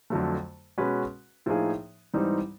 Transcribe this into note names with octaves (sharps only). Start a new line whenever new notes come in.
F2 D3 F#3 A3
B2 G#3 C#4 F#4 B4
A2 F3 A#3 D#4 G#4
G#2 E3 G3 C4 D#4